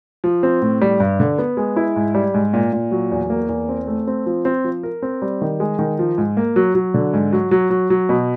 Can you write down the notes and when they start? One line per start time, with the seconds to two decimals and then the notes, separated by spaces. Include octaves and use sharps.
0.24 F3
0.43 C4
0.62 A2
0.81 G3
1.00 G2
1.20 D3
1.38 B3
1.57 G#3
1.76 E4
1.96 G#2
2.15 G3
2.34 G#2
2.53 A#2
2.73 A#2
2.91 F#3
3.12 E2
3.30 A#3
3.49 E2
3.69 C4
3.87 A3
4.07 C4
4.26 F3
4.45 C4
4.64 F3
4.83 A#4
5.02 C4
5.22 G3
5.42 D#3
5.60 G#3
5.79 D#3
5.99 F3
6.18 G#2
6.37 A#3
6.56 F#3
6.75 F#3
6.94 D3
7.13 G#2
7.33 F#3
7.51 F#3
7.70 F#3
7.90 F#3
8.09 B2